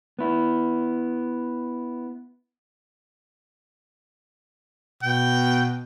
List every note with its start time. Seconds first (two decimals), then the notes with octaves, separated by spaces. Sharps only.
0.19 B3 E4
5.03 B2 G5